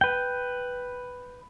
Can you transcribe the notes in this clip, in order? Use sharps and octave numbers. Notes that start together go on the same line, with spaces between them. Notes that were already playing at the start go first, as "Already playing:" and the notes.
B4 G5